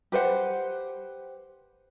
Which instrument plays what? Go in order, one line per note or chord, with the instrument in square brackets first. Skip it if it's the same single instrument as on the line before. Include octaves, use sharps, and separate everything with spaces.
[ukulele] G4 B4 C5 F#5